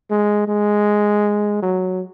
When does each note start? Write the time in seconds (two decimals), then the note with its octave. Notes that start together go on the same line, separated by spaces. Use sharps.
0.10 G#3
0.48 G#3
1.62 F#3